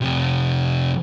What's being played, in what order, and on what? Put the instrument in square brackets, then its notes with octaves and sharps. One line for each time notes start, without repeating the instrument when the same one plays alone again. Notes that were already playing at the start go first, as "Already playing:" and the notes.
[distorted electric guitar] F2 C3